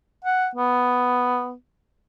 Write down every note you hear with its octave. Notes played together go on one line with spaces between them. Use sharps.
F#5
B3